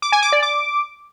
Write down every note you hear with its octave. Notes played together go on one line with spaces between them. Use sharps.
D6
G#5
D6
D5
D6